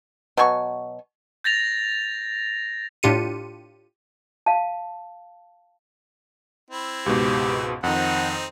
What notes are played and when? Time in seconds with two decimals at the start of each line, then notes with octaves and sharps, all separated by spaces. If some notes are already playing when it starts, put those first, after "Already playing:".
0.37 B2 F#3 G#5 C#6
1.44 G6 A6 A#6 F7
3.03 A2 D4 F4 G4 C#7 D#7
4.46 F5 A5
6.70 C4 E4
7.06 C#2 G#2 B2 G4
7.83 F2 D#3 C4 D#4 F#5